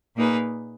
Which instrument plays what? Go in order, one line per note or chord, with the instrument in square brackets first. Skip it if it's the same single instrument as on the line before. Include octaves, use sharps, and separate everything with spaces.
[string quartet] A#2 A#3 D#4 G#4 B4